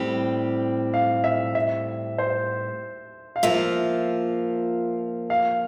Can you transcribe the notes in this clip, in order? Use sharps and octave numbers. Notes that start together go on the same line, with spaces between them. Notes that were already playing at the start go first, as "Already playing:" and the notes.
Already playing: A2 G3 C4 G4
F5
E5
E5
C5
F5
F3 A#3 F4 E5
F5